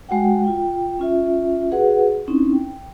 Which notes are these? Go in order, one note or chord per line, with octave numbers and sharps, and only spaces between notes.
G#3 F#4 F#5 G5
F4 G5
C#4 F4 E5
F#4 G#4 B4 F#5
C4 C#4 D#4 E4
G5